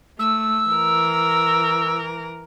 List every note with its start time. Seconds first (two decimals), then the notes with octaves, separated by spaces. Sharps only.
0.19 A3 E6
0.70 E3 A#4